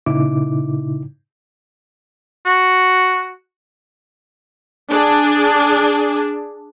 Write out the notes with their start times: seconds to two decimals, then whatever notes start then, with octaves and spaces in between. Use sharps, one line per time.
0.06 A#2 C#3 D#4 E4 D6
2.46 F#4
4.89 D4 G#4